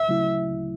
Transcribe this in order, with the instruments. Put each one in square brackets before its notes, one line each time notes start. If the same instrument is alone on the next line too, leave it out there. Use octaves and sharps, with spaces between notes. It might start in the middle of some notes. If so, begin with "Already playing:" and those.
Already playing: [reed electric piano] D2 [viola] E5
[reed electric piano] C#3 F#3 A3 E4
D2